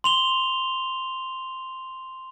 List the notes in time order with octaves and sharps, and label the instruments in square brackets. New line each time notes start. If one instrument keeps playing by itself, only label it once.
[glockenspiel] C6 F7 G7